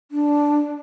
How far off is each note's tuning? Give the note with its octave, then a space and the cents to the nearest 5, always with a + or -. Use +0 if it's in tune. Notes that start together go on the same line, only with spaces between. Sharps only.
D4 -5